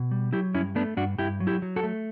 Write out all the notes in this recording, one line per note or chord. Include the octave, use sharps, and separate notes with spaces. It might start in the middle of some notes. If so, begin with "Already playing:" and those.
Already playing: B2
G3
F#3 E4 G4
G2 C#4 E4
A3 B3 D4
G2 D4 F#4
G2 E4 G4
F#3
E4 G4
F#3
F#4 A4
A3